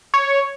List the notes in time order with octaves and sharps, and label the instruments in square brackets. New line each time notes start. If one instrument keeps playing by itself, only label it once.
[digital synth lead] C#5